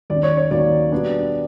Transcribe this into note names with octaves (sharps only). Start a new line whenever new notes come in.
D#2 D#3 F#3 A#3 C#4 D5
C#5
C#5
D#2 D#3 F#3 A#3 C#4 D5
B2 G3 B3 D4